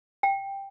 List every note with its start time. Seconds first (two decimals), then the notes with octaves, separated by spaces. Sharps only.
0.23 G5